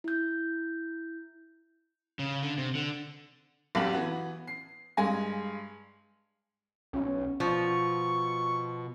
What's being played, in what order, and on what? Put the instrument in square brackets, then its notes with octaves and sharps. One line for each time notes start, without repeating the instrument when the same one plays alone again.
[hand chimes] E4 G6
[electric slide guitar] C#3
D3
C3
D3
[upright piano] B1 F#2 G4 F#5 F#7
E3 B3 F#4
C7
G2 G#3 F5 G#5 A#6
[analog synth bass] B1 [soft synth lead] C#4
[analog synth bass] B2 [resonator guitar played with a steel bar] F3 [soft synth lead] C#6